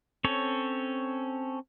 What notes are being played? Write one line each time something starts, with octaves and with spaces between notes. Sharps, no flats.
C4 C#4 A4 C#5